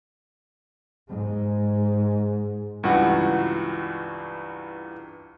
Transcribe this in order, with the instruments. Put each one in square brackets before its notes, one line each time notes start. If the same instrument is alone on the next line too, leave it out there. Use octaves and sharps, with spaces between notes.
[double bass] G#2 G#3
[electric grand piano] C#2 G2 E3 F#4 F#5